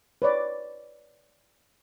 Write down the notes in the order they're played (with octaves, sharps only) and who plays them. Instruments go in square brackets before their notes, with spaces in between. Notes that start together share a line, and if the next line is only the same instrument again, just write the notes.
[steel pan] B4 C#5 D5